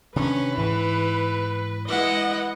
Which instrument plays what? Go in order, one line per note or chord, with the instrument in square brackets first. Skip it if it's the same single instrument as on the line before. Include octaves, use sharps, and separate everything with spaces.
[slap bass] C3 D#3 D4 [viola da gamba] C#4 [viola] B4
[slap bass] G#2 [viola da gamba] E3
[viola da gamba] G#3 E4 B4 [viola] D#5 F#5